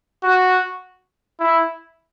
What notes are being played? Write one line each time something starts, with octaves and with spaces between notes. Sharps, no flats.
F#4
E4